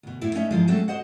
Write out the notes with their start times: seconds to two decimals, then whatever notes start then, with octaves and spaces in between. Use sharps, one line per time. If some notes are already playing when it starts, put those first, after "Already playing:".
0.03 D2 B2
0.21 A2 E4 E5
0.35 A3 C#4 D#4 D#5 E5
0.51 G#2 E3 F3 G#3
0.68 F#3 G#3 A3 C4 C#4 A4
0.88 F#4 C5 D#5 F#5